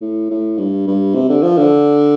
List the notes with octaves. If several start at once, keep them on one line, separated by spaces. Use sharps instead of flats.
A2
A2
G2
G2
C3
D3
F3
D3